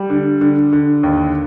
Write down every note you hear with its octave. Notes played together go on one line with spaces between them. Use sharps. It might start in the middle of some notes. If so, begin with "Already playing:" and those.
Already playing: G3
D3
D3
D3
D#2